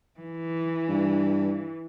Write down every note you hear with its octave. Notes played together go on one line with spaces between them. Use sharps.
E3
G2